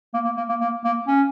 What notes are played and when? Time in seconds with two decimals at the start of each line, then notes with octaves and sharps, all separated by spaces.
0.14 A#3
0.25 A#3
0.37 A#3
0.49 A#3
0.61 A#3
0.84 A#3
1.07 C#4